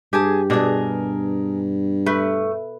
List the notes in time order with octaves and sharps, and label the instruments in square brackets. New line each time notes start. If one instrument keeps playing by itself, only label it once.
[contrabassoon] G2 [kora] G4 [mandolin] G#4 G#5 A5
[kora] B2 D4 [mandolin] G#4 A#4
[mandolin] A3 [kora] B4